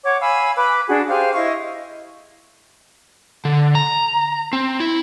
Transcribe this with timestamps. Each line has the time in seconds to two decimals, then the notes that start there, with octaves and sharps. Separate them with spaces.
0.04 C#5 F#5 D6
0.20 F5 G#5 B5 E6
0.56 B4 B5 D6
0.88 D4 F#4 G#4
1.09 G4 G#4 C5 F5
1.34 E4 D#5 F5 C#6
3.45 D3
3.75 A#5
4.53 C4
4.80 E4